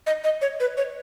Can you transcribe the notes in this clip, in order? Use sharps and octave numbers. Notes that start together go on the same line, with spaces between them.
D#5
D#5
C#5
B4
C#5